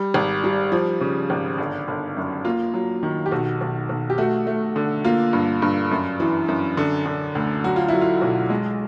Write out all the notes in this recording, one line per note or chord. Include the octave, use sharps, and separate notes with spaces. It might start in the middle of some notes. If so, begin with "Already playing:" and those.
Already playing: G3
G#1
G3
F3
C#3
G#1
G1
G1
F#2
A#3 F4
F#3
D#3
G4
B1 F#4
B1
B1
G4
A3 F#4
A3
D3
A#3 F4
G2
G2
F#2
E3
F#2
D3
D3
D2
F#3 F#4
F4
F#3 E4
F4
B1
G#3